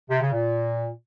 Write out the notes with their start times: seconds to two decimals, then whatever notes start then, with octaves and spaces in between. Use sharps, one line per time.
0.10 C3
0.21 C#3
0.32 A#2